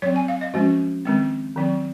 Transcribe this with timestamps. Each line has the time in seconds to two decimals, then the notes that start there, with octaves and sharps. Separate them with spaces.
0.02 F#3 C4 C#5
0.16 G#5
0.28 F5
0.41 D#5
0.54 F3 G#3 C#4 F#4
1.05 D#3 G#3 C4
1.56 D#3 F#3 C4